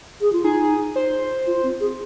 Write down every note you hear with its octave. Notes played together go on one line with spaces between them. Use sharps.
G#4
F4
D#4 G#4
C5
F4
C4
G#4